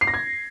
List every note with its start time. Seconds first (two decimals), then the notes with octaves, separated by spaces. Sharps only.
0.01 C7
0.07 A#6
0.14 G#6